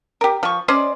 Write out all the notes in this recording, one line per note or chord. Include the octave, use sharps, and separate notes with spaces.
G4 A#4
F3 C#6
C#4 C5 D5 D#5